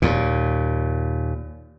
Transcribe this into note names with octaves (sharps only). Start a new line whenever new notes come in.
D#2 A#2